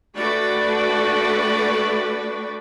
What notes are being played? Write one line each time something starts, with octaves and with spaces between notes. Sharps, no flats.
A3 D4 F#4 B4 D5 G5